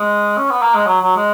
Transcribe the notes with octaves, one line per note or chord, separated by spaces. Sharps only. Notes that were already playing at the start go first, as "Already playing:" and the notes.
Already playing: G#3
C#4
B3
A#3
G#3
F#3
F#3
G#3